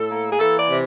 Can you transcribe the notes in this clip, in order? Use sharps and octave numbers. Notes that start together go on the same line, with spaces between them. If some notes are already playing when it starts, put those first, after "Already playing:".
Already playing: A2 A4
A#3
G#4
E3 A4
D5
C3